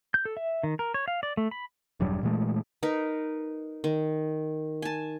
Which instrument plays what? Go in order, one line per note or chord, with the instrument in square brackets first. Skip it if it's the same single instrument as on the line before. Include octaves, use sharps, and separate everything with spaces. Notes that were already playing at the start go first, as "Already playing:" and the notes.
[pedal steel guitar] G6
A4
E5
D#3
A#4
C#5
F5
D5
A3
B5
[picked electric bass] E1 G2 F#3 G3
A#2 E3 G#3 A3
[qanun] D#4 A#4 B4
D#3
G#5 A5